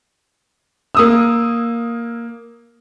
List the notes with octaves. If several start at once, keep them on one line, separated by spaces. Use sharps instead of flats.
A#3 D#6 E6